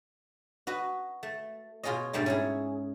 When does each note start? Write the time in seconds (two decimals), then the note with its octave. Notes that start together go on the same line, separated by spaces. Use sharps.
0.67 F#4 B4 D#5
1.23 A3
1.83 B2 F4 G#4 C#5 D#5
2.13 G#2 B2 G3 A3 D4 D#4
2.26 C#4 E4 G#4